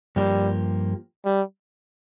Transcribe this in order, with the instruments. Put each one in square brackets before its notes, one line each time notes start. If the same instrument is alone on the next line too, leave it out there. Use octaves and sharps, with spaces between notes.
[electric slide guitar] G2 F3 A#3 G4 [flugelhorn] G3
[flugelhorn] G3